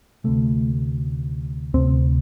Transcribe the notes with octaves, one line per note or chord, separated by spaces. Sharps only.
D2 C3 A3
D2 C3 C4